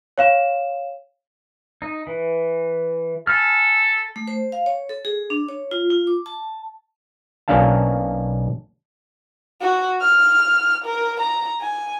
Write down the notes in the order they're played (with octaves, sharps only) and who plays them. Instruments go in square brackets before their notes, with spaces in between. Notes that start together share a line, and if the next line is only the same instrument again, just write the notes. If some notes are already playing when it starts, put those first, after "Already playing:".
[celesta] C#5 F5 E7
[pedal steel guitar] D#4
E3
[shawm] A4 [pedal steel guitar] G#5 B5 F6
[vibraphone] A3
C5
F5
C#5
A4
G#4
D4
C#5
F4
F4
D6
A5
[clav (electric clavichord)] B1 A#3 C#4 D4 F5 A5
[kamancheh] F#4
F6
A#4
A#5
G#5